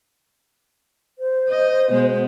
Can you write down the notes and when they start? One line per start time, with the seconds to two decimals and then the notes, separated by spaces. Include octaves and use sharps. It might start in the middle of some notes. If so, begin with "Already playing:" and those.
1.19 C5
1.49 D#5
1.89 B2 G#3 B3